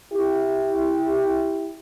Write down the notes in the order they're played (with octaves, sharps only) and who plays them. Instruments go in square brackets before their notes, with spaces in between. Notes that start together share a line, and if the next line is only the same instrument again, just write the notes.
[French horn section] E4 G4